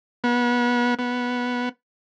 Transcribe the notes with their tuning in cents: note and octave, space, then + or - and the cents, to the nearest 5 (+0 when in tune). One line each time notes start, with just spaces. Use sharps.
B3 -30
B3 -10